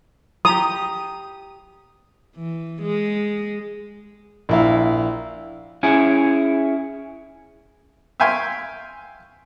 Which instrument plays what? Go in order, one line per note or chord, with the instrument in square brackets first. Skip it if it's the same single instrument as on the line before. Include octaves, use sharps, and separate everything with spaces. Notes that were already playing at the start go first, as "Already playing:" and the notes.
[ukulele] G4 A#5 [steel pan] D#6
[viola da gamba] E3
G#3
[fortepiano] A#1 E4 F5
[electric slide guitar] C#4 E4 G#4
[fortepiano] E5 F5 G5 G#5 C6 C#6